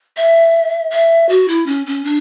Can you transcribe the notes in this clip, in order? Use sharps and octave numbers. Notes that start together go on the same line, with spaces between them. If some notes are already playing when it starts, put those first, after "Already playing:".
E5
E5
F#4
E4
C#4
C#4
D4